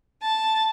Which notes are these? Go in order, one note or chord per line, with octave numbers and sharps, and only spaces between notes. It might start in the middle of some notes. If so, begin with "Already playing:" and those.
A5